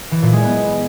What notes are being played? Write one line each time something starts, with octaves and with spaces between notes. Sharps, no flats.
E3
A#2
G#3
B3